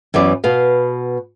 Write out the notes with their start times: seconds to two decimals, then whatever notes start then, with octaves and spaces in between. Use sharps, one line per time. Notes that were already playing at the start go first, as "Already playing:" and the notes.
0.14 F#2 E3 B3 D5
0.44 B2 B3 F5